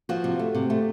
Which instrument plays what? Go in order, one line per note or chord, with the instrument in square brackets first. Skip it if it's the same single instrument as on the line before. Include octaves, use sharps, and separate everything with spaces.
[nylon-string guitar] F3 F#4
C3
A3
C3
A3